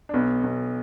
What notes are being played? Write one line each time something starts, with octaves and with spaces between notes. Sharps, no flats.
D4
B1 B2 B3
B1 B2